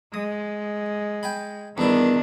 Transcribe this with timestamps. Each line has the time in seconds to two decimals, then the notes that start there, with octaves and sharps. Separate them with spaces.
0.14 G#3 D#6
1.23 G5 G#5 B5
1.78 E2 G2 D#3 D4 E4